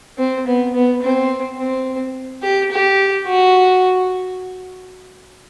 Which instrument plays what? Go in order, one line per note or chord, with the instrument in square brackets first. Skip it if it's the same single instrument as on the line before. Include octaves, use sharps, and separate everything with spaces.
[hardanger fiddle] C4
B3
B3
C4
C4
G4
G4
F#4